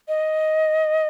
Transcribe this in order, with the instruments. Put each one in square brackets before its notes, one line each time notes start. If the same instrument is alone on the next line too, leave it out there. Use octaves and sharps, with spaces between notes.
[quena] D#5